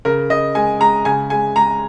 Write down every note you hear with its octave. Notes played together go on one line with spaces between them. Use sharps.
C#3 A#4
C#3 D#5
G#3 G#5
G#3 A#5
C#3 G#5
G#3 G#5
G#3 A#5